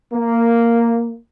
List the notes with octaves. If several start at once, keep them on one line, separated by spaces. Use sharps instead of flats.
A#3